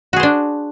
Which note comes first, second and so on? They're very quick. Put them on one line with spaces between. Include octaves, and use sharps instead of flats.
F#4 G#4 C5 D4